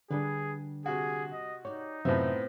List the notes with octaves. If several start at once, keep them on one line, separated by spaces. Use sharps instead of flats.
D3 G3 D4 G#4 B4
C3 F#4 G#4
D#5
D#4 G4 C#5 D5
F#2 A2 C3 B3 C4 F4 E5